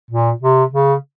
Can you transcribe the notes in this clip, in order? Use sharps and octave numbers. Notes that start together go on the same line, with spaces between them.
A#2
C3
C#3